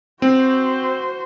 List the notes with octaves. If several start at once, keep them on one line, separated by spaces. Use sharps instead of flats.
C4 F#4 C5